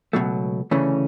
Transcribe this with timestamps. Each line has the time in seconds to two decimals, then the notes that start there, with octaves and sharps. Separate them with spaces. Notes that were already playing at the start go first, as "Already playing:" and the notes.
0.13 C#2 B2 F#3 A3
0.71 D2 C#3 E3 A3 C#4